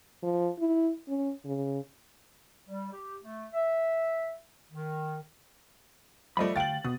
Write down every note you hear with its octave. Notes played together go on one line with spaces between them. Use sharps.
F3
E4
C#4
C#3
G3
G4
A3
E5
D#3
F3 A3 D5 D#5 B5
D2 F5 G5 A6 F#7
B2 D#6